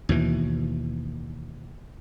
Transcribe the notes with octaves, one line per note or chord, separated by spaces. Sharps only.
D#2 B2 E3